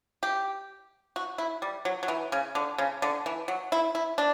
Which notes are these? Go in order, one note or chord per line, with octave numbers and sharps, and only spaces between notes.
G4
F#4
E4
G3
F#3
F#3
E3
C#3
D3
C#3
D3
E3
F#3
E4
E4
D4